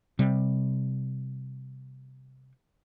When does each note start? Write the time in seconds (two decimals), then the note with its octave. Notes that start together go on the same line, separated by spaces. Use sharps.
0.19 C3 G3